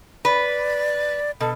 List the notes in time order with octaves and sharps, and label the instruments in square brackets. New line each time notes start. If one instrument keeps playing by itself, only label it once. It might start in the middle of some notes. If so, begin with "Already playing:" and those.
[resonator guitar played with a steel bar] B4 [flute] D5
[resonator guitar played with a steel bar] B2 [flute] A4